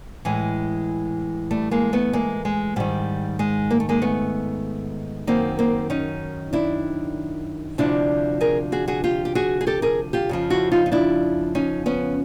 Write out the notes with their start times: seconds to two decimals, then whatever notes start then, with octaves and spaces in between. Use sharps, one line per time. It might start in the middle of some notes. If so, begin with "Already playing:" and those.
0.25 A2 E3 G#3
1.51 G3 A3
1.71 G#3 A#3
1.93 A3 B3
2.13 G#3 A#3
2.45 G#3
2.76 G#2 D#3 G3
3.39 G#3
3.70 A#3
3.80 A3
3.89 G#3 A#3
4.02 A3 B3
5.27 F#2 D#3 A#3 C4
5.59 A#3 C4
5.90 C#4 D#4
6.53 D4 E4
7.78 D2 C3 F3 D4 E4
8.41 G#4 A#4
8.72 F#4 G#4
8.88 F#4 G#4
9.04 F4 G4
9.25 G4
9.35 F#4 G#4
9.61 G#4
9.67 G4 A4
9.82 G#4 A#4
10.13 F4 G4
10.29 F2 C#3 F3
10.50 E4 F#4
10.72 D#4 F4
10.86 D#4
10.92 D4 E4
11.55 C#4 D#4
11.86 B3 C#4